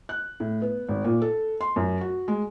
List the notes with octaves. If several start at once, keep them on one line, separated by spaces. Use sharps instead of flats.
F#6
A2
B3
G#1
A#2
A4
C6
F#2
F#4
G#3